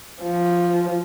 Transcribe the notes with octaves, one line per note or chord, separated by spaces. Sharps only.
F3